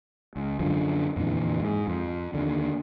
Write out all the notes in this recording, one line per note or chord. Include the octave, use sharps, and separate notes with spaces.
C#2
F#2 D3 F3
F2 A#2 D3 E3
G#2
F2
D#2 D3